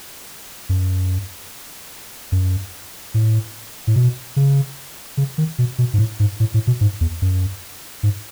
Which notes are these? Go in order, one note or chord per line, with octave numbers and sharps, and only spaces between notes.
F#2
F#2
A2
A2
B2
C#3
C#3
D#3
B2
B2
G#2
A2
G#2
A2
A2
B2
G#2
E2
F#2
G#2